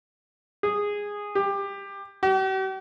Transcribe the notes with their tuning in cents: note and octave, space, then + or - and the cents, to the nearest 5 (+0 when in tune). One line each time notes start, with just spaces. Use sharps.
G#4 -10
G4 +20
G4 -45